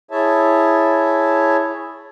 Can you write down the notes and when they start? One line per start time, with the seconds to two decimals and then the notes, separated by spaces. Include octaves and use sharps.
0.11 E4 G#4 C#5 E5 A5